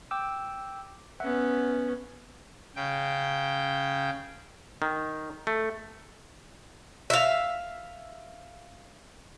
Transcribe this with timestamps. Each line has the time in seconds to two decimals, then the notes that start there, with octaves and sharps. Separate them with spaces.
0.11 G5 D6 E6
1.20 B3 C#4 E5 F#5
2.76 C#3 G5
4.82 D#3
5.47 A3
7.10 E5 F5